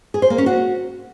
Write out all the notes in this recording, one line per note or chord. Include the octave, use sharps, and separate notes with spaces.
G#4
C5
A#3
C#4
F#4